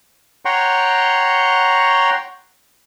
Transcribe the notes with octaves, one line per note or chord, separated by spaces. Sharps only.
C#5 F#5 G5 A#5 C6 C#6